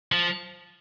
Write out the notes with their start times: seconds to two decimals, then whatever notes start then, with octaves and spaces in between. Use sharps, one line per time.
0.12 F3